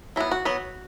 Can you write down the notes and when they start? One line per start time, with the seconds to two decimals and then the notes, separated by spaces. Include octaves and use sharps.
0.16 F#3 B3 E4
0.31 F#4
0.45 F#3 B3